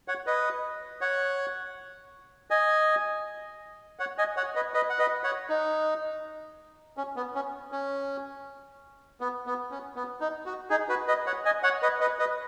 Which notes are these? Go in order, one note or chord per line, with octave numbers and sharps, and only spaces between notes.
C#5 F#5
B4 D#5
C#5 F#5
D#5 G#5
C#5 F#5
D#5 G#5
C#5 F#5
B4 D#5
B4 D#5
F#5
B4 D#5
C#5 F#5
D#4
C#4
B3
C#4
C#4
B3
B3
C#4
B3
D#4
F#4
D#4 G#4
F#4 B4
B4 D#5
C#5 F#5
D#5 G#5
C#5 F#5
B4 D#5
B4 D#5
B4 D#5